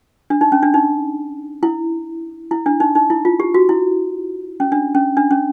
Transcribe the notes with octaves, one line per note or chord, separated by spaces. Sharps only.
D4
D#4
C#4
D4
D#4
E4
E4
D4
D#4
D#4
E4
F4
G4
F#4
E4
C#4
D4
C#4
D4
C#4